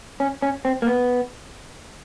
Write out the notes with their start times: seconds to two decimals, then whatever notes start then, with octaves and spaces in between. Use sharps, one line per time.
0.20 C#4
0.42 C#4
0.65 C4
0.82 A#3
0.87 B3